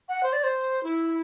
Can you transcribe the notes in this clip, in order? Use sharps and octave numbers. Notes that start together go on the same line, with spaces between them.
F#5
C5
D5
C5
E4